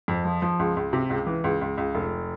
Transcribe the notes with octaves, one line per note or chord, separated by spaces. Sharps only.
F2
F3
F3
C#2
C#2
C3
C#2
E3
C#2
C#2
C#2
F1